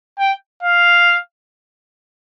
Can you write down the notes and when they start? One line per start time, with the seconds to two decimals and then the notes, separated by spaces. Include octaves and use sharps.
0.18 G5
0.63 F5